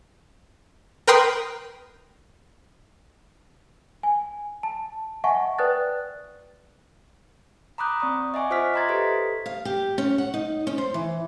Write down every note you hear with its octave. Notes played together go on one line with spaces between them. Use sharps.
A#4 B4 G5 C6 D#6
G#5
A5
D#5 E5 F#5 G#5 A5 C#6
B4 D5 G5 D#6 F#6 A6
A#5 B5 D6 D#6 F#6 G6
C4 D5 C#6 D#6
D#5 E5 F#5 G#5 C#6 D6
F4 C5 E5 D6 F6 B6
D#5 E5 A#5 C6 G#6 A6
G4 A4 B4 C5 B6
F5
G4
C#4
F#5
D#4
C#4
C5
E3